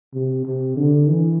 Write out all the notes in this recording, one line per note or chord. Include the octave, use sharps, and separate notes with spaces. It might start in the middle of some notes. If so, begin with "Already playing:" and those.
C3
C3
D3
E3